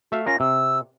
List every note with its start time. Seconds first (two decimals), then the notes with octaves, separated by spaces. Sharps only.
0.12 A3 F#4 E5 F5
0.26 C#4 F4 A#4 A#6
0.40 C3 E6